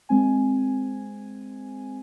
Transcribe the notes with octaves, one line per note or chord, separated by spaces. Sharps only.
G#3 C4 G#5